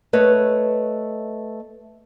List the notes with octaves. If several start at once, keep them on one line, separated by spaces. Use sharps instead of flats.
A3 B4 C#5 D#5